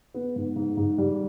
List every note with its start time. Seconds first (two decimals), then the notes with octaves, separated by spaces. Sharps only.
0.14 B3
0.36 G#2
0.56 G#2
0.77 G#2
0.98 G3